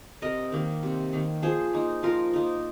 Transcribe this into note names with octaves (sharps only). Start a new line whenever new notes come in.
C3 A#4 D#5
D#3 A#3
C3
D#3 A#3
F3 G#4 C5
A#3 D#4
F3 F4 A#4
A#3 D#4